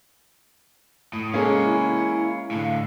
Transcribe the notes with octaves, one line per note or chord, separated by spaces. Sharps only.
A2 D#6
G#3 A#3 C#4 A4 F5 G#5
E4
A2 D3 F5